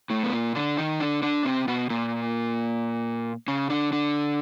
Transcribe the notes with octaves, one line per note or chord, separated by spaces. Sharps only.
A2 A3
B3
A#2 A#3
D3 D4
D#3 D#4
D3 D4
D3 D4
C3 C4
B2 B3
A#2 A#3
C#3 C#4
D3 D4
D3 D4